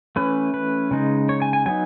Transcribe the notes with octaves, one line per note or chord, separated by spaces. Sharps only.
E3 A3 C#4 B4
B4
C#3 G#3 D#4
C#5
G#5
G#5
F#3 B3 D#4 G#5